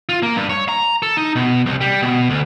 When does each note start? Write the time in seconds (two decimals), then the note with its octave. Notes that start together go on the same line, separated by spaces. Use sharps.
0.09 F4
0.23 A#3
0.36 G2
0.50 C#5
0.69 A#5
1.02 A4
1.17 D#4
1.36 B2
1.66 C2
1.81 G3
2.02 B2
2.30 D2